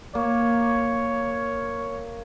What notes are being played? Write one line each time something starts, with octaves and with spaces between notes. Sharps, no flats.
A#3 C#5